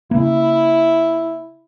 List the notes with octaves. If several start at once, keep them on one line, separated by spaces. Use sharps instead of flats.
C#3 A#3 E4